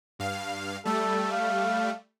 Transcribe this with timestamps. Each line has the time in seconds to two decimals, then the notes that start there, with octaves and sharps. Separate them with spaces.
0.19 G2 F5
0.85 G3 A3 A4
1.32 F5